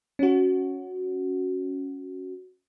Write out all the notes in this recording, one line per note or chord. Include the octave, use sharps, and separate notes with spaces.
C#4 F#4